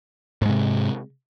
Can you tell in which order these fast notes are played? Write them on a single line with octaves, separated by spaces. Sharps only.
G#2 G#3 C3